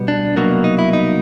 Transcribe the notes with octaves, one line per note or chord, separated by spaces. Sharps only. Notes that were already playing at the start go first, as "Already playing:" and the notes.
Already playing: B2 G3 B3
D4
C2 B2 F#3 A#3
D#4
E4
D#4